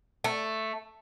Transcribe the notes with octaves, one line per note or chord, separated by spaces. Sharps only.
A3